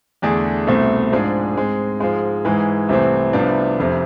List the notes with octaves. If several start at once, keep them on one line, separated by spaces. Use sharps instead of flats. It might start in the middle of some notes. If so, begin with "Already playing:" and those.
E2 D3 A3 D4 G#4
C2 B2 A3 C4
G#2 F3 G#3 D4 G#4
G#2 G#3 C4
G#2 F3 G#3
G#2 E3 G#3
C2 C3 E3 A3 C4
C2 C3 F3 B3 D4
F1 F2 C3